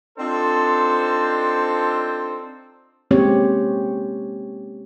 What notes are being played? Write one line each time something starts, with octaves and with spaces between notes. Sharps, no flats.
C4 D4 D#4 F4 A4 C5
G#3 A#3 C4 C#4 G4 C#5